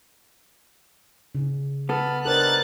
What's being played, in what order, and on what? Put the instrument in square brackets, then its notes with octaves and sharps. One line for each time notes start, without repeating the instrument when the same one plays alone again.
[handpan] C#3
[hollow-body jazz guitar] B3 A4 [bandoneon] A5 B5 F6
[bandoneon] D4 D#4 G4 [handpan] A#4 C5 [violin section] F#6 A6